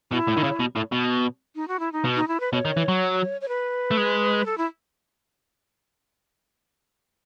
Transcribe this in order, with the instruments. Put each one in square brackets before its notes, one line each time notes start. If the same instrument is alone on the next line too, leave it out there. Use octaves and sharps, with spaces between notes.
[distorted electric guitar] B2 [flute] E4
[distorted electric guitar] A2
D#3
C#3
B2
A2
B2
[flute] D#4
F#4
E4
D#4
[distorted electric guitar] B2
[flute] D#4
E4
B4
[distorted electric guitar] B2 [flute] C#5
[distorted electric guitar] D#3
E3
F#3
[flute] C#5
B4
[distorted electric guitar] A3
G#3
[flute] A4
E4